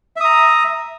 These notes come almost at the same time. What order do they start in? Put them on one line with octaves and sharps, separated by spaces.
E5 D#6 A#5